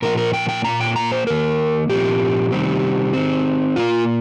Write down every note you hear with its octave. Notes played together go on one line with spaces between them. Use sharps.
A#2 F3 A#3 A#4
A#4
G5
G5
A#2 A#3 A#5
G5
A#5
C5
D#3 A#3 A#4
A#2 F3 C4 G4
C3 D#3 G3 C4
D#3 C4
A#2 A#3 F4